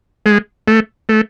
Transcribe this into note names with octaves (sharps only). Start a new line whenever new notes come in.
G#3
A3
A3